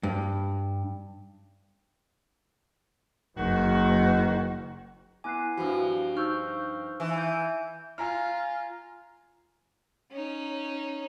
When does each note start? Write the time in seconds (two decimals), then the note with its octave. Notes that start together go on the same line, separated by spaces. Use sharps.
0.03 G2
3.37 F#1 D#3 F#4
5.24 B3 E4 G#5 D6 F#6 C7
5.57 G2 F3 F#4
6.16 D#4 C5 C#6 E6 F6 G6
7.00 E3
7.17 G#5 G6
7.98 F4 G#5 A#5 F6
10.12 C#4 D#4